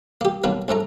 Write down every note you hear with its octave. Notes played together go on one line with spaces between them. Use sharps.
A#3 G4
B2 D#3 F#3 A#3
A#1 G#2 A3 A#5